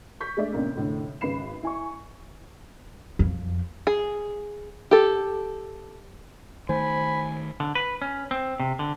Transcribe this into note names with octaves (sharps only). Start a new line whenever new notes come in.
C#6 G6 B6
G#3 A3 D4 D5 E5
A1 C3 A#3 D4
F1 A2 D3
G#1 C#3 B4 B5 C7 E7
E4 G#5 C#6
F2
G#4
G4 A4
D#3 A3 C5 G#5 B5
D3
B4
C#4
C4
C3
D3